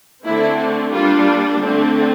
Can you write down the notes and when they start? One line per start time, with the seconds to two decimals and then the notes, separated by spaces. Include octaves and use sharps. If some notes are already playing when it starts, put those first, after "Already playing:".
0.24 D3 A3 C4 E4
0.93 G3 A#3 D4 F4
1.61 D3 A3 C4